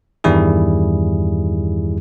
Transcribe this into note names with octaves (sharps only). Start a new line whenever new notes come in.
E2 G2 D#3 G3 E4 G#4